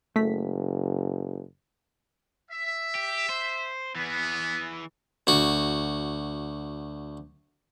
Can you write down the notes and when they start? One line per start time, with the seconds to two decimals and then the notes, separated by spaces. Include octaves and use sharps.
0.16 F#1 A3 B6
2.50 E5
2.95 G4
3.29 C5
3.95 E3 B3 G#4
5.27 D2 F#4